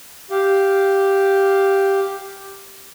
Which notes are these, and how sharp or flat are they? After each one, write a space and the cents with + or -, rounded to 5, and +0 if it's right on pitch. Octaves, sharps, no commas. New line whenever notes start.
G4 +0 F5 +0